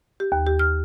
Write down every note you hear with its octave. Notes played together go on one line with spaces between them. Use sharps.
G4
D#2
G4
F6